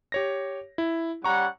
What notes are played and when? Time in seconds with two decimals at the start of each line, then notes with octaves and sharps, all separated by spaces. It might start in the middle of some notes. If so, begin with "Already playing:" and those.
0.12 G4 C#5 A#6
0.78 E4
1.24 G3 C#4 F#5 A#5 C#6